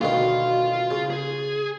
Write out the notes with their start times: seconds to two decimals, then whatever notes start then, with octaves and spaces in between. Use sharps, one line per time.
0.01 D2 B2 D#3 F4 F5
0.91 C#3
1.10 G#4